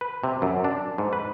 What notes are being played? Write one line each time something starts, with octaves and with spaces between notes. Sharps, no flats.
B4
C3
F#2
D4
G#2
B4